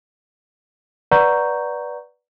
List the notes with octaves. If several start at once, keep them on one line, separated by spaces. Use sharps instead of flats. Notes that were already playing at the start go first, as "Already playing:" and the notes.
B4 D5 F#5 A#5 C#6 G6